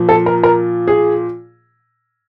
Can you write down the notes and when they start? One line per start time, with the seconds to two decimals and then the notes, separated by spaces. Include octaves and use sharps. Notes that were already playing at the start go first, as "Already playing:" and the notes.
Already playing: A#2 F3
0.09 A4
0.26 A#4
0.43 A#4
0.88 G#4